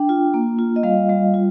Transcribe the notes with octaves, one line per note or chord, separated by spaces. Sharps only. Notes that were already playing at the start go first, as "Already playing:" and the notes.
Already playing: D4 G5
F4
A#3
F4
D#5
G3 F5
G3
F4